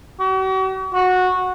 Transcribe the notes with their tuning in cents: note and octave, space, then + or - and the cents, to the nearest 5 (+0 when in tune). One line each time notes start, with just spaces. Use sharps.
F#4 +45
F#4 -15